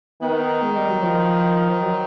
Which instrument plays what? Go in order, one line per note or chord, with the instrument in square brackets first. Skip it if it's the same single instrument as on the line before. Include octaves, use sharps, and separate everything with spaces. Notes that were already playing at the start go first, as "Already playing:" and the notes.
[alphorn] D#3 [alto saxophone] B3
[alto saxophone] G#3
G3
F#3
F3
F3
F#3